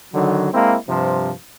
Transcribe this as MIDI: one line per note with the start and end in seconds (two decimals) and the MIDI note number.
0.14 0.51 50
0.14 0.51 51
0.14 0.51 54
0.54 0.76 56
0.54 0.76 58
0.54 0.76 60
0.54 0.76 64
0.88 1.32 43
0.88 1.32 48
0.88 1.32 53